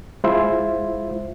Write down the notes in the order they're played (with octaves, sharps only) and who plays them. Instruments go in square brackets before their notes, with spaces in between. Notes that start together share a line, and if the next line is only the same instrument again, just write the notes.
[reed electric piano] G#3 E4 F4 C5 E5